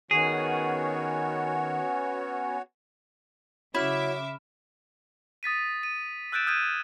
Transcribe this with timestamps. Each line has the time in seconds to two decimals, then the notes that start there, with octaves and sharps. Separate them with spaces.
0.11 D#3 B3 C#4 F#4 G#4 C#5
3.74 C#3 F#3 E4 E5 B5 D6 F6 E7
5.43 D#6 A6 B6 D#7
5.83 D#7
6.32 E6 F#6 G6 A6 D7 E7
6.47 D#6 F6 G6 G#6 D#7 E7